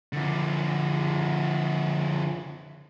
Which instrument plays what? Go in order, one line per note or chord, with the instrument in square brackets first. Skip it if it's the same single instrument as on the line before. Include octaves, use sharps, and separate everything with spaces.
[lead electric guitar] D3 F3